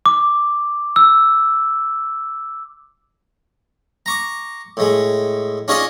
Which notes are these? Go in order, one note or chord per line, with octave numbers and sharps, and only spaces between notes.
D6
E6
A#5 C#6 D6
A2 G#3
C#4 D4 F4 G#4 C#5 D#5